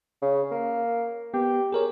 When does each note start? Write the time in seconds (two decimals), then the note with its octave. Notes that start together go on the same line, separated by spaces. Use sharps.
0.22 C#3
0.51 A#3
1.34 B3 G4
1.72 G#4 A#4 C#5